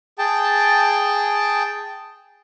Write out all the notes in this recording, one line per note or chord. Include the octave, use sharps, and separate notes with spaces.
G#4 G5 A5